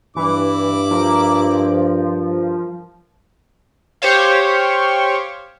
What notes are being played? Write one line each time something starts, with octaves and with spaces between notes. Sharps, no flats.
G2 E3 E4 D6
F3 A#4 F5
G4 C5 C#5 F5